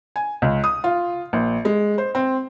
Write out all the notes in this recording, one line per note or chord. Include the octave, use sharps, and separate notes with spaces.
G#5
C#2
D#6
F4
A#1
G#3
C5
C4